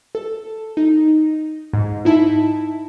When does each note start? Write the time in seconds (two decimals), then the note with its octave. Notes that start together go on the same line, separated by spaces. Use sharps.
0.15 A4
0.77 D#4
1.73 G#2
2.05 D#4 E4 A5